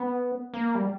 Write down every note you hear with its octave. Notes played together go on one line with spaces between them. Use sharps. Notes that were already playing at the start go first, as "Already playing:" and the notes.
Already playing: B3
A#3
G3